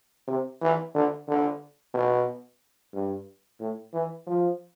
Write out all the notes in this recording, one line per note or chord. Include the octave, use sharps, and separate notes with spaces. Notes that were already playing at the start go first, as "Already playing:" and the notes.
C3
E3
D3
D3
B2
G2
A2
E3
F3